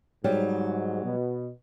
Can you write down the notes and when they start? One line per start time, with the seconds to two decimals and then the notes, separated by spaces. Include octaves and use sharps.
0.24 G#2 F#3 G3
1.03 B2